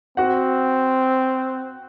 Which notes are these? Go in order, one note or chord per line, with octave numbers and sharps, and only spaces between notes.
C4 F#4 F#5